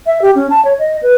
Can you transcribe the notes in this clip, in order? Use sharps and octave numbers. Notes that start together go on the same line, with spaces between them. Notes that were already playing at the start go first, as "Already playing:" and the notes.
E5
G4
C#4
A5
C#5
D#5
B4